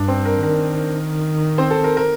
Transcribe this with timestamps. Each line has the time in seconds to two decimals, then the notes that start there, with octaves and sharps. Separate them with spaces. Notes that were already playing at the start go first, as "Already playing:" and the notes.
Already playing: G2 D4 D5
0.08 C4 C5
0.25 A#4
0.43 D#3 A#4
1.58 C4 C5
1.71 A4
1.84 A#4
1.97 A#4